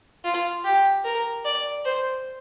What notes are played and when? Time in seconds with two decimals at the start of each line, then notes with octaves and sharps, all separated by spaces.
0.24 F4
0.64 G4
1.04 A#4
1.45 D5
1.85 C5